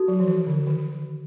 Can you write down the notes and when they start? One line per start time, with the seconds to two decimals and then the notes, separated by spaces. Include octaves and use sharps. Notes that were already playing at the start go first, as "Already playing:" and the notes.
Already playing: D#4 F#4 A4
0.08 F#3
0.20 F3
0.27 E3
0.47 D3
0.67 D#3